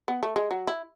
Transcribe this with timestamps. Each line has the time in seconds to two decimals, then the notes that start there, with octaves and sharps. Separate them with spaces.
0.08 B3
0.23 A3
0.36 G#3
0.51 F#3
0.67 E4